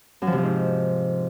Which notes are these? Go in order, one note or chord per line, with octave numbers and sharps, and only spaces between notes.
F#2
F3
C3
F3
G#2